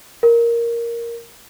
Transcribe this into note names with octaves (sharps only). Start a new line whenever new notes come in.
A#4